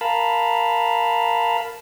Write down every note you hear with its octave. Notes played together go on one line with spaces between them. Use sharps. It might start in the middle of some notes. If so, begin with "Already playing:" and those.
A#4 F5 A5 B5